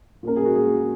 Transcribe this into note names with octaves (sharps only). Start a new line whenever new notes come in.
A#2 A#3 C#4 A#4
G#4
F#4
G#4